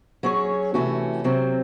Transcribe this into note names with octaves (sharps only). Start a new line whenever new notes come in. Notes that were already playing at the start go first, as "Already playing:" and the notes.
F#3 C#4 G#4 C#5
C3 E3 A3 C#4 F#4
C3 F#3 C4